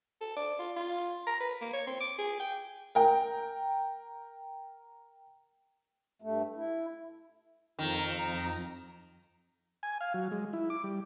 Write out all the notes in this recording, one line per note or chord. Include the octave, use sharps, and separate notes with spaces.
A4
D5
F4
F4
A#5
B4
A#3
C#5
C4
D6
G#4
G5
A#4 G5
G2 A3
E4
F2 D#3 A#5
G#5
F5
F#3
G#3
E4
D6
G3